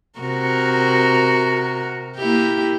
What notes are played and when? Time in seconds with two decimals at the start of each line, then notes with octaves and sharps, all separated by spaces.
0.19 C3 F#4 A#4
2.17 A#3 E4 G4